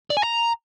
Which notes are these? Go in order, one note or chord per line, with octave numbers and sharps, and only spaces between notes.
D5
G#5
A#5